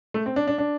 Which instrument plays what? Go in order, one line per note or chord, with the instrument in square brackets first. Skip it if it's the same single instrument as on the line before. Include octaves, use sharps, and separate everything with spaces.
[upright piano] A3
C4
D4
D4
D4